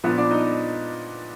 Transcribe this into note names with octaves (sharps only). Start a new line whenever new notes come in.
A#2 F3 B3 D4 B4
D4 D5
D#4 D#5